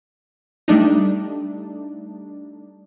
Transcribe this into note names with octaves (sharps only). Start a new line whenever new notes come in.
G3 A3 D4 D#4